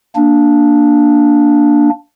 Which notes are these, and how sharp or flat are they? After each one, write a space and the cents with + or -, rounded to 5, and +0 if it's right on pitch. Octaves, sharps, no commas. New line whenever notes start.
A#3 +0 D4 +0